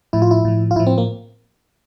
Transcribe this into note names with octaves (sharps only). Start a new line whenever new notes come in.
A2 F3 E4
F4
E4
A2 F3
F4
A2 F3 E4
C4
A#3